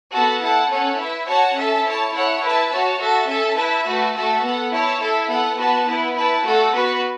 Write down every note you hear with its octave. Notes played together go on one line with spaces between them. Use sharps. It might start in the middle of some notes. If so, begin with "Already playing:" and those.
B3 F#4 A4 F#5 A5
E4 A4 F#5 A5
C#4 A4 C#5 F#5
E4 B4 E5
F#4 C#5 F#5 A5
C#4 A4 E5 A5
E4 C#5 A5
E4 A4 C#5 F#5
E4 B4 E5 A5
F#4 C#5 A5
F#4 A4 E5 A5
C#4 A4 E5 A5
E4 B4 E5 A5
A3 F#4 B4 A5
A3 F#4 A4 E5 A5
B3 A4 F#5
E4 C#5 E5 A5
E4 A4 E5
B3 A4 F#5
B3 F#4 B4 A5
B3 E4 B4
E4 B4 A5
A3 F#4 A4 F#5
B3 F#4 B4